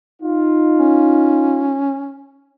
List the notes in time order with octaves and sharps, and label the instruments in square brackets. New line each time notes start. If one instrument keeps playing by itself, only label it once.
[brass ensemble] D#4 F4
[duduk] C#4